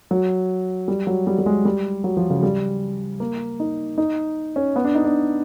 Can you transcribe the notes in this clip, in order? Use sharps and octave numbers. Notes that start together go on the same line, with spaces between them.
F#3
G3
F#3
G3
G3
G#3
G3
F#3
F3
C#3
G3
A#3
D#4
D#4
C#4
B3
D4
D#4
D4